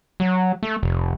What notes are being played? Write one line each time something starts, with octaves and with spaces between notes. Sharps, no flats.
F#3
A3
F1